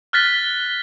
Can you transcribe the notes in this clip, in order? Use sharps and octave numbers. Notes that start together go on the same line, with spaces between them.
F6 F#6 A6 B6 G7